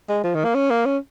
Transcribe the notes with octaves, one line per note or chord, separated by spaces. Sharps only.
G#3
F3
D#3
A#3
C#4
A#3
C#4